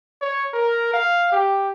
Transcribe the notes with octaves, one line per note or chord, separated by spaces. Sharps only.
C#5
A#4
F5
G4